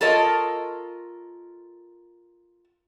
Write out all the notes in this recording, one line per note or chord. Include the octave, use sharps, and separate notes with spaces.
F4 A4 A#4 C#5 D#5